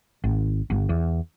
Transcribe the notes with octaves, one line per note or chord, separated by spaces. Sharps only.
G#1
G1
E2